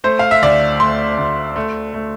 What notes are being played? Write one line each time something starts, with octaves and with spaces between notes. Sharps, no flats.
A3 C5
F5
E5
D2 D5
A3 C6
D2
A3
A3